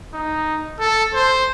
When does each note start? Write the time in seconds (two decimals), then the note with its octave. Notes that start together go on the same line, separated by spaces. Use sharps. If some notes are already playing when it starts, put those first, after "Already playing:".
0.14 D#4
0.79 A4
1.14 C5